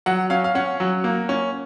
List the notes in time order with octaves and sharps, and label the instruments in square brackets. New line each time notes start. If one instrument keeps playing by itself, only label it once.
[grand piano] F#3 F#5
C#4 F5
F5
C#4 F#5
F#3
A#3
C#4